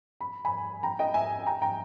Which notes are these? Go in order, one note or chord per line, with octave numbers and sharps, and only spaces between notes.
B5
G#5 B5
G5 A#5
D#5 G5
E5 G#5
G5 A#5
G5 A#5